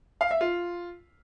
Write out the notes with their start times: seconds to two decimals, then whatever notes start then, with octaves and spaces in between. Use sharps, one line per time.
0.21 F5
0.31 E5
0.41 F4